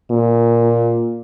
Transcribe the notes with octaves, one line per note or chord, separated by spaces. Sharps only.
A#2